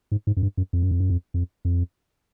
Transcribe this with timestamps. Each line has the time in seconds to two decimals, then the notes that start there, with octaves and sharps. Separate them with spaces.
0.12 G#2
0.27 G#2
0.37 F#2
0.43 G2
0.57 F#2
0.73 F2
0.82 F#2
0.91 F2
1.00 F#2
1.10 F2
1.34 F2
1.65 F2